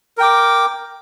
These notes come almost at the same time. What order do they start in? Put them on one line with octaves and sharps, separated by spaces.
A#4 G5 D6